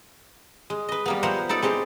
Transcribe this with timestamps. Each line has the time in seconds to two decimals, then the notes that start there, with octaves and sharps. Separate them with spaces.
0.70 G#3
0.89 B4 D#5
1.06 G3 A#3 B3
1.23 F3 B3 A#4 C5 E5 F#5
1.49 D#4 E4 A4 D5
1.62 G#3 C4 G4 G#4